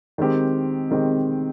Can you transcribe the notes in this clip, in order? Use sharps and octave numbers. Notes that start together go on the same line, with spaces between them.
D#3 G#3 C4 G4
D#3 G#3 C4 G4